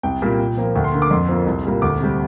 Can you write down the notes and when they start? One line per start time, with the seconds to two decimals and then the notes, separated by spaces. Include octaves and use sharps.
0.03 C2 G5
0.22 A#2 G3 A#3
0.40 A#2
0.57 F3 A#3
0.75 D2 G5
0.84 C6
0.92 D3 A#3
1.02 D6
1.11 F2 C6
1.28 F3 A#3
1.46 C2
1.65 A#2 G3 A#3
1.82 D2 D6
2.00 C3 G3